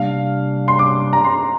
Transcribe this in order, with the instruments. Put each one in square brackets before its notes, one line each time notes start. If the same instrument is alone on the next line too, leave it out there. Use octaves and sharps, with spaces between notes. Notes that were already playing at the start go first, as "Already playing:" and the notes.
Already playing: [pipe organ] C3 G3 A#3 D4 [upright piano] F5
[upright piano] C6
D6
A#5
C6